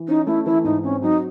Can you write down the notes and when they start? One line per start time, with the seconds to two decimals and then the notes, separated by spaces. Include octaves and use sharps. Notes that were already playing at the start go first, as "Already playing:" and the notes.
Already playing: E3
0.08 C#4 D#4
0.27 A3 E4
0.45 E3 E4
0.64 G#2 D#4
0.83 C4 C#4
1.02 F#3 D#4